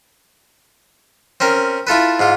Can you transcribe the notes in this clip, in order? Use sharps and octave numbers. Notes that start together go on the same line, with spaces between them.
C4 C#4 A#4
E4 F4 A4 B4
G#2 F4